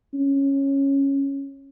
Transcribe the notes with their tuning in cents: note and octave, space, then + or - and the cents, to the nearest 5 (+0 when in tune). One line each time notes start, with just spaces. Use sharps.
C#4 -10